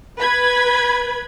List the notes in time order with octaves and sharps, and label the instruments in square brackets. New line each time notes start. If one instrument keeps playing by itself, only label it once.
[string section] B4 B5 G#6